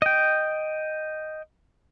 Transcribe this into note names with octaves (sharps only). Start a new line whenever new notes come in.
D#5 G5